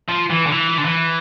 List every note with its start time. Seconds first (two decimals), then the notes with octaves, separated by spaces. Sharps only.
0.09 F3
0.30 E3
0.46 D3
0.52 E3
0.78 D3
0.85 E3